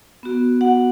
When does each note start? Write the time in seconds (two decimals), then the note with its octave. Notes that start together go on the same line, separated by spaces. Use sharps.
0.23 B3 F#4
0.61 F#4 F#5